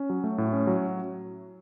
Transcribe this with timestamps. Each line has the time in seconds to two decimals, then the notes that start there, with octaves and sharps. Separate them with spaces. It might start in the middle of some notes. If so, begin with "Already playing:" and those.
Already playing: C#4
0.10 F#3
0.24 A3
0.38 A2
0.53 C#4
0.67 F#3